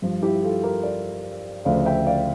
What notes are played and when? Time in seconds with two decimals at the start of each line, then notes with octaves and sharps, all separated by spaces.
0.02 G2 F3
0.22 E4 G4
0.43 F4 A4
0.63 G4 A#4
0.83 A#4 D5
1.65 D2 C#3 F3 D5 F5
1.86 E5 G5
2.06 D5 F5